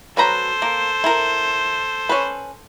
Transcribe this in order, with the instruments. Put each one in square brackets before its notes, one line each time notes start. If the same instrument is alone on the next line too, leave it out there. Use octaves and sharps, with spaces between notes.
[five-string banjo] F#3 B4 A#5 [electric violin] A4 C5
[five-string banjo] A#3
E4 A#4
C#4 B4